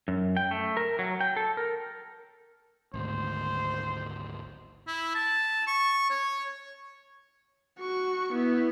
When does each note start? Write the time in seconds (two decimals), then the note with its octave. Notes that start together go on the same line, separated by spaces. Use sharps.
0.08 F#2
0.37 G5
0.51 A3
0.77 A#4
0.99 F#3
1.21 G5
1.37 A4
1.57 A#4
2.94 G#1 D2 C5
4.87 E4
5.15 A5
5.67 C#6
6.10 C#5
7.80 F#4 C#6
8.33 B3 E4